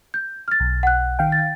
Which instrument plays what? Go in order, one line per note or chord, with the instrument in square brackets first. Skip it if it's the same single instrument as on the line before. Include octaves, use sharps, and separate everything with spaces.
[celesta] G6
F6 A6
[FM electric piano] B1
[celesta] F#5 F#6
[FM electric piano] D#3 F5 G5
[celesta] A6